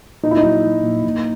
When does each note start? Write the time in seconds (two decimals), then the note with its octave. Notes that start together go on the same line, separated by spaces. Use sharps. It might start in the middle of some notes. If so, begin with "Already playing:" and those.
0.23 A#2 D#4
0.31 E4
0.37 D#4
0.43 F#3
0.64 F#3
0.83 A#2
1.03 A#2